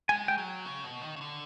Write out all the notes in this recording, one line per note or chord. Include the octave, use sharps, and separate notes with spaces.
G#3 G#5
G5
F#3
C#3
B2
D#3
C#3
D3